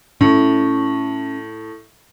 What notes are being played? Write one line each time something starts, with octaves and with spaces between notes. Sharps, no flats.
A2 C#4